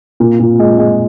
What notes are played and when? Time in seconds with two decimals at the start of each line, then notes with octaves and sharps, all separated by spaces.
0.20 A#2
0.40 A#2
0.59 G#3
0.79 G#3